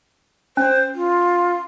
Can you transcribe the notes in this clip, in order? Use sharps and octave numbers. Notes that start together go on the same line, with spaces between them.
C#4 C5
F4